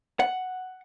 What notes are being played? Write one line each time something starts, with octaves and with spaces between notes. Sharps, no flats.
F#5